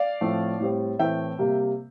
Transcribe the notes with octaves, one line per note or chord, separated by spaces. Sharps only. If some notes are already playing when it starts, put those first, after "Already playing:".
Already playing: D5 F5
A2 F3 A3 C4
A2 G3 C4
A2 E3 A3 C4 E5 G5
C3 G3 A#3